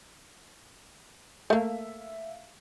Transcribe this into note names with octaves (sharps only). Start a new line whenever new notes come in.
A3 A#3 E5 F5